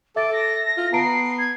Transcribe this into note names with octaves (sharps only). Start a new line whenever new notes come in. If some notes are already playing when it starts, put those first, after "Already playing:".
A4 E5 D6 A6
A#6
F4
B3 A5 A#5 C7 D7
G#6